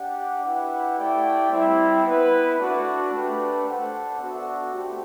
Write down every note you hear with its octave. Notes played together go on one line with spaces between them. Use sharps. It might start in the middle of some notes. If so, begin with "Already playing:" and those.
Already playing: D4 G4 D5 F#5
E4 G4 B4 F#5
A3 E4 G4 D5 G5
G3 C4 E4
B3 E4 B4
A3 D4 F#4
A3 D4 G4 B4
D4 A4 C5 F#5
B3 D4 F#4 A4 E5
A3 C4 G4